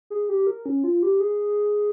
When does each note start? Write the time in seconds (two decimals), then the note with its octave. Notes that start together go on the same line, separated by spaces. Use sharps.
0.10 G#4
0.29 G4
0.47 A#4
0.66 C#4
0.84 F4
1.03 G4
1.20 G#4